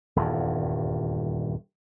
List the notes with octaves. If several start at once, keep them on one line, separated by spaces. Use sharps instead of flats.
D#1 E2 G2